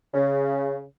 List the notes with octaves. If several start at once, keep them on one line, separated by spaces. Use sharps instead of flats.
C#3